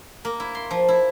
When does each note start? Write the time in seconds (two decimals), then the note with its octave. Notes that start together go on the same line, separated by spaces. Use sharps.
0.25 A#3
0.40 E4
0.55 C6
0.71 F3
0.88 E4